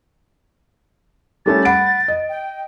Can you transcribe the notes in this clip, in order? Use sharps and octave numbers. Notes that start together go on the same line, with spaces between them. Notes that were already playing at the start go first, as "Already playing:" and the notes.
G3 A3 C#4 A6
F#5 B5 D7
D#5
G5